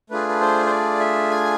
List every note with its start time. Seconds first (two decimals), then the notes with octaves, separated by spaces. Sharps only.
0.10 A3 D4 F4 G#4 B4
0.29 B4
0.41 C5
0.66 C5
0.70 D5
1.00 E5
1.30 G#5